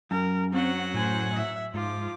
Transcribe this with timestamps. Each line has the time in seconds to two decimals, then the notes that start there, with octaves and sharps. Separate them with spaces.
0.11 F#2 A#4
0.53 F#3 C4 F#4 F#5
0.94 A2 C5 G#5
1.33 E5
1.74 G#2 F3 F4 D6